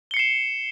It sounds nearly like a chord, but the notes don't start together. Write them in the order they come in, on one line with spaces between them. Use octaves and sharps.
G7 C#7 C7 E7